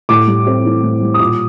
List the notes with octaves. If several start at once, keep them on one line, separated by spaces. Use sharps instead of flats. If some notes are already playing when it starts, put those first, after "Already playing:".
A2 D6
G3
C4
E3
A2
G3
D#6
A#2 D6